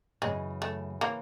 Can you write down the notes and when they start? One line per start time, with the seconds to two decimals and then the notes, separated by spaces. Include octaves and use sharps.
0.22 F#2 C#3 E3 G#3
0.62 A3
1.01 C#3 E3 A#3